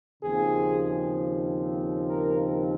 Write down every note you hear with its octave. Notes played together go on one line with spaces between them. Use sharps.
D#2 C#3 F3 C4 G#4
A#4